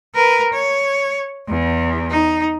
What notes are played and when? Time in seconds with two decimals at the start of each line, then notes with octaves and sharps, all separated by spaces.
0.15 A#4 B4
0.53 C#5
1.48 E2
2.10 D#4